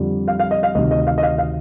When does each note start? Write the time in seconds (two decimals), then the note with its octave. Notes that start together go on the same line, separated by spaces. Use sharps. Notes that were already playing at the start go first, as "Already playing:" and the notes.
Already playing: F2 D3 G3
0.28 F5
0.40 F5
0.51 D#5
0.63 F5
0.75 D2 C3 D#3 D#5
0.91 D#5
1.07 F5
1.18 D#5
1.23 F5
1.38 F5